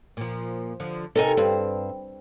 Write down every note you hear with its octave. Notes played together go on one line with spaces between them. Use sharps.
A#2 F3
D3 F3
C3 D#4 A4 A#4 G#5
G2 C4